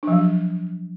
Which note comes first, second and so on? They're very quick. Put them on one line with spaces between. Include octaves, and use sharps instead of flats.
D4 F3 F#3